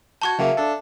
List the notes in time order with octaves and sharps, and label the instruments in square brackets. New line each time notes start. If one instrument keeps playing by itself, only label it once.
[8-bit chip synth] F#4 G6 [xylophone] A5 C#6 G#6
[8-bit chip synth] C#3 F#3 A#3 [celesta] E5 F5 G5
[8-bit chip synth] D4 A4